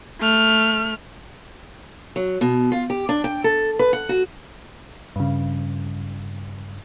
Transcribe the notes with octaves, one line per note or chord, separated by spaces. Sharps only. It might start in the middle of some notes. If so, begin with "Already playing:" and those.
A3 F6
F#3
B2
F4
G4
D4
G5
A4
B4
F#5
F#4
G2 C#3